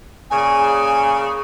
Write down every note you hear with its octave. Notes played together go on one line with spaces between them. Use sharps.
A#2 C#3 G#5